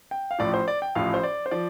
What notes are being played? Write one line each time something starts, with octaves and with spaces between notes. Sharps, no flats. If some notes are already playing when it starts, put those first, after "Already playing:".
G5
F5
A1 A2 F3 D5
C5
D5
G5
A1 A2 F3 F5
C5
D5
C5
F3 D5